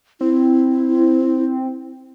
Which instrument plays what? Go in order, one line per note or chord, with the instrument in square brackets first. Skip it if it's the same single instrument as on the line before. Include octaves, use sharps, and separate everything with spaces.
[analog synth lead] C4 [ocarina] E4